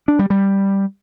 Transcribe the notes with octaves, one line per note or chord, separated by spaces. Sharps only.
D4
G3
G3